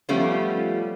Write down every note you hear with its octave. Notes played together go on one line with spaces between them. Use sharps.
F3 G3 A3 B3 C#4 F4